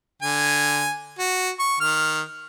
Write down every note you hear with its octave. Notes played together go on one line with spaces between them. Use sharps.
D3 G#5
F#4
C#6
D#3 F6